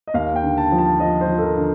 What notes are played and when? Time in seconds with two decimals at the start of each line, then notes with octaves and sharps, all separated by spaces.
0.07 D#5
0.14 D#2 F5
0.36 G5
0.43 D3
0.58 A5
0.72 F3
0.79 A5
1.00 F3 D#5
1.21 C5
1.28 F3
1.38 A4
1.42 A#4
1.57 D3